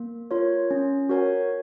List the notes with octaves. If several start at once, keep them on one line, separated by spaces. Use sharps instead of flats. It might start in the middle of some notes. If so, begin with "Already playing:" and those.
Already playing: A#3
F4 A#4 C#5
C#4
F#4 A#4 C#5 G#5